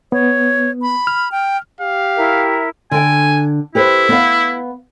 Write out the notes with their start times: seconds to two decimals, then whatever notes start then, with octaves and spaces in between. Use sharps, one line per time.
0.12 B3 C#5
0.82 B5
1.07 F6
1.32 G5
1.81 G4 F5
2.17 E4 A#4 E5
2.91 D3 G5 G#5
3.75 E4 G4 B4 C5
4.09 B3 F5